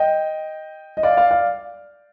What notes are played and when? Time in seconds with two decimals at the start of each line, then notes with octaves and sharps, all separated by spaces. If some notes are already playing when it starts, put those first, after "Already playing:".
Already playing: D#5 G5
0.97 D#5
1.03 D5 F5
1.17 D5 F5
1.31 D5 F5